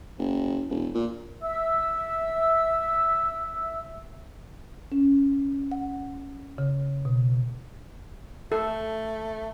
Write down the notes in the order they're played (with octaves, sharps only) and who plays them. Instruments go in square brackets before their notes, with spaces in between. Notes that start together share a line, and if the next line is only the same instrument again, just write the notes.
[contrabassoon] F#1
E1
A#2
[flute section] E5 E6
[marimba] C#4
F#5
C#3
B2
[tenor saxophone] A3 [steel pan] A4